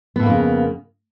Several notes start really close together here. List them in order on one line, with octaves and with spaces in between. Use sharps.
B3 A2 A#3 F2 C#3